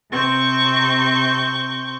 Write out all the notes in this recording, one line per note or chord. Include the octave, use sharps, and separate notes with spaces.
C3 C4 C#6 G6